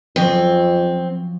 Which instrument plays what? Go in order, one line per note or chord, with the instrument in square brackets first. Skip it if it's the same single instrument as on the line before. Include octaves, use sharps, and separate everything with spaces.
[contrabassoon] F2 [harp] F3 F#3 C#4 [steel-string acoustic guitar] C4